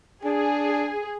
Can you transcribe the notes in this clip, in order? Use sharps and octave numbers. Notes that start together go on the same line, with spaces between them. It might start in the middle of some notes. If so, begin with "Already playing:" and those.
D4 G#4